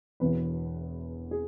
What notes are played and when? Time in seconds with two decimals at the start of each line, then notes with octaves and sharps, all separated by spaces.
0.20 E1 E2 E3 B4
1.31 G#4